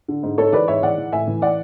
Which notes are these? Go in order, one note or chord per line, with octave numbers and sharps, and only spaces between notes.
D3
G#2
G#2 A4 C#5
E3 B4 D5
G#2 C#5 E5
E3 D5 F#5
E3
A2 E5 G#5
E3
D5 F#5